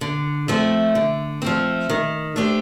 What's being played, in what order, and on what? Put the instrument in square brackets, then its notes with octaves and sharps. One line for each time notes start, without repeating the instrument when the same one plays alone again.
[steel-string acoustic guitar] D3
F3 A3 C4
D3
F3 A3 C4
D#3
A3 D4 G4 C5